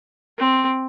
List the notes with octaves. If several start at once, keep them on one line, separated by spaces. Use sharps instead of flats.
C4